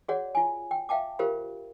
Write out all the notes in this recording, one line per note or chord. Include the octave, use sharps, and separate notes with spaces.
F#4 G#4 C#5 D5 F#5
F4 G#5
G5
E5 F5 G5 A5 D6
F4 G4 A#4 C5 F5 B5